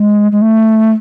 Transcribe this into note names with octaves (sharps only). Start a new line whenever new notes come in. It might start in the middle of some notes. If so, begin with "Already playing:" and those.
Already playing: G#3
G#3
A3